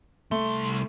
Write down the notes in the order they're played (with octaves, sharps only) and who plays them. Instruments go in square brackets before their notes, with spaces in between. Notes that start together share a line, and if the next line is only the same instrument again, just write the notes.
[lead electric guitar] C2 C6 [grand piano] A3